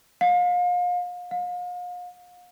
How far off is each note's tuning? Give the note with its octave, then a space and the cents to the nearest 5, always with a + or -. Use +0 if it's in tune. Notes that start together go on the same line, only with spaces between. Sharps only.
F5 +35
F5 +40